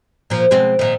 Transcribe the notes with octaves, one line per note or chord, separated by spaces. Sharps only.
A#2 F3
B2 G#3 C4
A#2 D#3